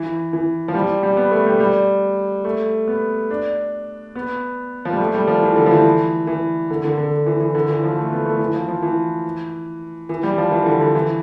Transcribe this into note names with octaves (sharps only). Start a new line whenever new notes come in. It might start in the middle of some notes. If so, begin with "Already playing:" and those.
Already playing: E3
E3
F3
G3
G3
B3
A3
G3
G3
A3
B3
D4
B3
F3
G3
A3
G3
F3
E3
D3
F3
E3
E3
D3
D3
D3
E3
E3
D3
E3
F3
A3
B3
A3
E3
F3
F3
E3
E3
G3
F3
E3
D3
D3
E3